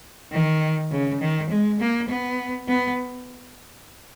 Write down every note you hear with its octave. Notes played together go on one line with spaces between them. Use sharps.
D#3
C#3
D#3
G#3
A#3
B3
B3